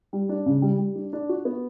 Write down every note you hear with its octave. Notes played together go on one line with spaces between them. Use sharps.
G3
D4
C#3
G3
G3
D4
D4
F#4
B3